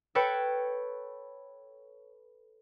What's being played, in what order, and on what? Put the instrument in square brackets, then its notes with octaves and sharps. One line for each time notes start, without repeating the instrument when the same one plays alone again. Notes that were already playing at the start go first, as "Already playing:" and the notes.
[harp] A4 B4 C#5 G5